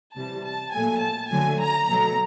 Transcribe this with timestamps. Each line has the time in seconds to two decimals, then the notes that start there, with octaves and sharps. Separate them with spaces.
0.16 C3 E3 G3 A5
0.45 A5
0.73 A#2 F#3 A3 G#5
1.02 A5
1.31 D3 F#3 A3 G#5
1.60 A#5
1.88 B2 F#3 A3 A#5